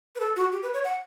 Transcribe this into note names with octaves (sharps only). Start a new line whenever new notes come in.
B4
A4
F#4
G4
B4
C#5
F#5